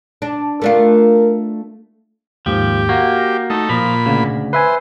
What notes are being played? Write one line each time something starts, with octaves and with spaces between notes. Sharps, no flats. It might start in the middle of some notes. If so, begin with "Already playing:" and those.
D4
A3 D4 F4 A#4
D#2 G#2 F3 G4
A#3 F#4
A3 D#4
A#2 F3 B5
D2 C#3
B4 C5 E5 G#5